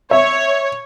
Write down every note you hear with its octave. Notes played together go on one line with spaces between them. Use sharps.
C#5 E5